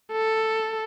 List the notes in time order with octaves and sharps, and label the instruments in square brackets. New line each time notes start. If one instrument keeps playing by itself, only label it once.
[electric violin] A4